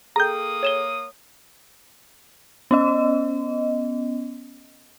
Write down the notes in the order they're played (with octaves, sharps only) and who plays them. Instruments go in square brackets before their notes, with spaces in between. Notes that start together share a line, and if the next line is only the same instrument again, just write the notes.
[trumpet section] A#3 D#6 [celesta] G#4 A4 G5 [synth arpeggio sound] A#5 G6
[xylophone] C#5 E7 G7
[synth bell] B3 C#4 D#5